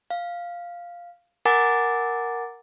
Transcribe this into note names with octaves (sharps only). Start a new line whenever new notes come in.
F5
A#4 F#5 G#5 A#5 D6 A6